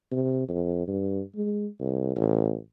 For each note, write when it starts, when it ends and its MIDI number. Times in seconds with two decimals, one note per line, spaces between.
0.12 0.46 48
0.49 0.83 41
0.87 1.21 43
1.35 1.67 56
1.80 2.16 36
2.16 2.56 33